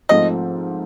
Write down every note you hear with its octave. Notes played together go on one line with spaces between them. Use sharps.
G#2 F3 A3 C4 F4 D#5